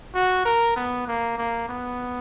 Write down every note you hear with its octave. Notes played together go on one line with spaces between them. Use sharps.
F#4
A#4
B3
A#3
A#3
B3